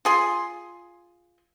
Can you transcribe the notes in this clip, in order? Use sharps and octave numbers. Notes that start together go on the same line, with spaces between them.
F4 G#4 C6